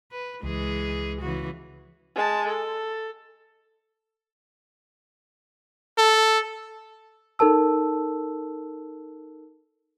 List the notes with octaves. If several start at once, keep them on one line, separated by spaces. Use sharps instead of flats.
B4
C#2 E3 G#3 G#4
C#3 E3 F#4
G#3 A5
A4
A4
D#4 A4 A#4 A5 E6